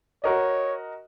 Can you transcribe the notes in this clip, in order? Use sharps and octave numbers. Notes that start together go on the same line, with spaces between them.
F#4 A#4 C#5 D#5